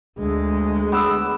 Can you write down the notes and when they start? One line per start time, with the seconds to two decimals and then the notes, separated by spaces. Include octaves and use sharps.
0.18 D2 G#3
0.92 B3 D6 E6